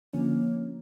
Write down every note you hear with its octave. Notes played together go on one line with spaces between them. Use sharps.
D3 F3 A#3 C#4